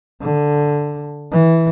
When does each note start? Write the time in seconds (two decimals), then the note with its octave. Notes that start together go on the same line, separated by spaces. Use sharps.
0.21 D3
1.32 E3